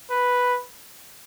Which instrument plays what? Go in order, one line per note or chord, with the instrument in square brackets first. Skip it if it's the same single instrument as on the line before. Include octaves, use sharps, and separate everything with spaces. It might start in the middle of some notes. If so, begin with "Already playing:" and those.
[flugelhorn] B4